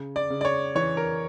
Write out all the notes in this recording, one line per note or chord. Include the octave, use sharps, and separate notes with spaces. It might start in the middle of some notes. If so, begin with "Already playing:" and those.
Already playing: C#3
D5
C#3
D5
C#5
E3 C#5
A#4